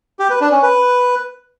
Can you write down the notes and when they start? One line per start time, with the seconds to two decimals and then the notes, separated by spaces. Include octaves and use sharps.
0.19 G4
0.30 B4
0.41 D4
0.52 C#4
0.63 B4